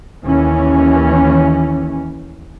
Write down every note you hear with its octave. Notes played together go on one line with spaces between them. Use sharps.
D#2 E3 C#4